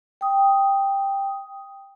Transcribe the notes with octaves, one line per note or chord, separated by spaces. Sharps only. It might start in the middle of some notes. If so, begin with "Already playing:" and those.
G5 D#6